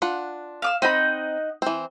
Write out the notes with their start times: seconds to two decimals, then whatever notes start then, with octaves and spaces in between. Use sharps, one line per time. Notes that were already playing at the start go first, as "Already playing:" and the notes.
0.02 D4 F4 F#5
0.62 F5 D6 E6
0.82 C4 D#4 D#5 F#5 B5
1.62 E3 C4